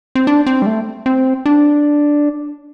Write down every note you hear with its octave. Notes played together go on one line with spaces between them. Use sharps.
C4
D4
C4
G3
A3
C4
D4